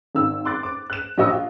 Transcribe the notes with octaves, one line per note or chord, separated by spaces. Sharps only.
G#1 D#3 E6
C6 D6 F#6 A6
D6
F#6 E7
A#1 G4 D#5 C#6 E6
F4